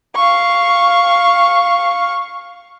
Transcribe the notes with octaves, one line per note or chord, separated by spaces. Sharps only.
F5 C#6